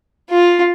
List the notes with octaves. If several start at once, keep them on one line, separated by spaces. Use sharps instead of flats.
F4